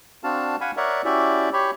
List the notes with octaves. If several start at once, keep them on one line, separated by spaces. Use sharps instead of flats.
C4 D4 F#4 F5 A5
F5 F#5 G#5 B5
A#4 C#5 D5 E5 F#5
C#4 E4 F#4 G4 D5 E5
G4 C#5 B5